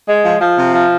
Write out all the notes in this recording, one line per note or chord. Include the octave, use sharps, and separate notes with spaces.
G#3
F3
F3
C3
F3